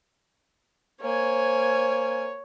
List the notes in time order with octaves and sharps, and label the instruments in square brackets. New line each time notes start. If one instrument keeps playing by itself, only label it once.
[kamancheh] A#3 G#5 [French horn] C5 [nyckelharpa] C#5